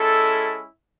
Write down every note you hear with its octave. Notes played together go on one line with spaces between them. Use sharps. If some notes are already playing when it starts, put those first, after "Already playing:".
Already playing: G#3 C#4 E4 A4